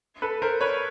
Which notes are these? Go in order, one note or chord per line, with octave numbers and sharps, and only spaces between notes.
A4 B4
A#4 C5
B4 C#5